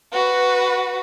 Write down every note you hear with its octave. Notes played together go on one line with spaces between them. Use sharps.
F#4 B4